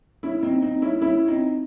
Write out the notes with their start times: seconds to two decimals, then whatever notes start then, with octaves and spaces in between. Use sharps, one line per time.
0.23 C#4 E4
0.43 C4 D#4
0.62 C4 D#4
0.82 C#4 E4
1.02 C#4 E4
1.28 C4 D#4